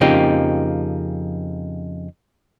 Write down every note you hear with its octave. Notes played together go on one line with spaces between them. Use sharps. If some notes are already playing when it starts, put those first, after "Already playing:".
F2 C#3 F3 A#3 D#4 G4